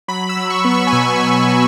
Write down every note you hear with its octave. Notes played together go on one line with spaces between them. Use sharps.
F#3 B5
E6
F#3
C#6
B3
C#6
G#5
B2 B5
B2
G#5
F#3